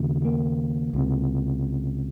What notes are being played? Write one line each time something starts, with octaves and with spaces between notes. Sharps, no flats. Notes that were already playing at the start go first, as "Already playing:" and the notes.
Already playing: D#2 C#3
A#3
C#2 C3